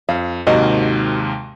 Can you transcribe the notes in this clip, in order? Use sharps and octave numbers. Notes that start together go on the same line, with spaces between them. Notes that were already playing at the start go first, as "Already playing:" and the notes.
F2 F5
D#2 G#2 C3 D#3 F#4 D#5